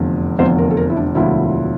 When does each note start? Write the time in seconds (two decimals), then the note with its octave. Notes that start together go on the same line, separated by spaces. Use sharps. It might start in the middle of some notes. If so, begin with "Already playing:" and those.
Already playing: F1 E2 D3 F3
0.38 F1 E2 D3 F3 C5
0.58 A#4
0.70 A4
0.77 A#4
0.90 E4
0.97 D4
1.15 E1 D2 D3 F3 E4